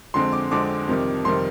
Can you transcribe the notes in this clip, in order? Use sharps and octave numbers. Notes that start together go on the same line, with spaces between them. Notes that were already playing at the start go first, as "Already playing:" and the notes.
F2 D3 G#3 C4 C6
D6
F2 D3 G#3 C4 D6
F2 C3 D#3 G3
F2 C3 D#3 G3 C6